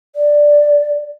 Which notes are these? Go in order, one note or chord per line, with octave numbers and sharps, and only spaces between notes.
D5